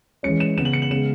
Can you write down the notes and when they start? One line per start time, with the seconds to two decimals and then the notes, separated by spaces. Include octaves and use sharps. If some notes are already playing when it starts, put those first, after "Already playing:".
0.23 E3 G#3 C#4 C#7
0.40 E7
0.57 C#3 G#3 B3 E7
0.65 F#7
0.73 C#7
0.82 F#7
0.90 C#3 G#3 B3 E7